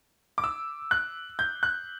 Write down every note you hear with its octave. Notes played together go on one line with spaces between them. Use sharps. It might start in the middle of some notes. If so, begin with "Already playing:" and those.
D6
E6
F#6
G6
F#6